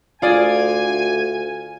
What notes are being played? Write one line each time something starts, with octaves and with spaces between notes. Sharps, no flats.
D2 F4 G#4 D5 G#5